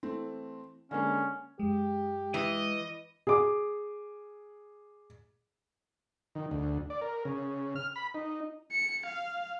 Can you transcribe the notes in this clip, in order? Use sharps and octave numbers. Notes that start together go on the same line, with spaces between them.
E3 A3 C4
D3 G#3 A#3 C#4
F#2 G#3 G4
E3 D#5
G#4 D6
D#3
D2
D5
A#4
C#3
F6
B5
D#4
C#7
F5